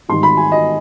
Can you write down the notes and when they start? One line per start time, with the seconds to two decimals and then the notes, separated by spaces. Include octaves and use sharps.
0.08 G#1 G#2 D#3 G3 C6
0.23 B5
0.37 G#5
0.52 D#5